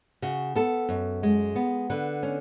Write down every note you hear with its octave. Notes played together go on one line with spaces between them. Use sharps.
C#3 F#4
B3 A4
F#2
G#3
B3
D3 B4
C#4